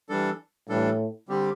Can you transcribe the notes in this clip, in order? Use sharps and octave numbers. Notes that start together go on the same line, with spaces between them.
E3 G3 D4 A4
A2 E3 G3 D4 A4
D3 G3 C4 G4